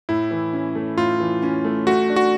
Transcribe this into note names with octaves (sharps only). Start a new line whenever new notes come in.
A2 E4
E3
C#4
A3
A2 F4
E3
C#4
A3
A3 F#4
D4
F#4